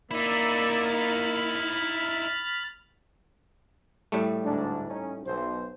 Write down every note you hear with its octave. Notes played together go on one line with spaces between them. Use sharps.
A#3 D#4 E4 D5 E5 B5
B5 F6 A6
A2 G3 A3
D2 G#2 D4
C#4 D#4
B1 C5